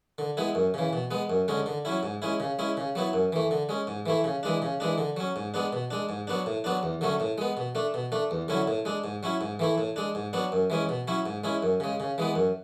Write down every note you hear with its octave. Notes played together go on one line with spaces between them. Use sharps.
D3
G#3 B3 E4
F#2
C#3 E3
B2
G#3 B3
F#2
D3 G#3 C#4
D3
F#3 C#4 E4
G#2
G#3 C#4 E4
C#3
G#3 C#4 E4
C#3
F#3 B3 E4
F#2
E3 A3
D3
G#3 C#4
G#2
E3 A3 E4
C#3
E3 G#3 D4
C#3
E3 G#3 D4
D3
F#3 C#4
G#2
G#3 B3 D4
B2
G#3 D4
G#2
F#3 B3 D4
A2
F#3 B3 D4
E2
D3 F#3 A3 C#4
A2
G#3 B3
B2
A3 D4
B2
A3 D4
E2
D3 F#3 C#4 E4
A2
G#3 D4
G#2
F#3 C#4 E4
G#2
E3 A3 E4
A2
G#3 D4
G#2
F#3 B3 D4
F#2
E3 G#3 C#4
B2
F#3 C#4 E4
G#2
G#3 C#4 E4
F#2
C#3 G#3
C#3
E3 G#3 B3
F#2